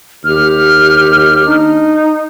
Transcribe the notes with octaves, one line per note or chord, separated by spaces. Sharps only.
D#2 G4 F6
D4 D#4